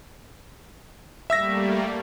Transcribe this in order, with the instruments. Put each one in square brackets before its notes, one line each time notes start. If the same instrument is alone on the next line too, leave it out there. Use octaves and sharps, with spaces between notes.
[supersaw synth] G3 A3 A#3 [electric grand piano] E5 E6 A#6